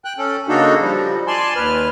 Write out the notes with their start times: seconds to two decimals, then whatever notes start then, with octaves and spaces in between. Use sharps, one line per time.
0.05 G5 F#6
0.18 C#4 A4
0.48 C#3 A#3 D4 D#4 F#4 A4
0.81 F3 G3
1.27 D5 G#5 A5 C6
1.56 D#2 B4 F6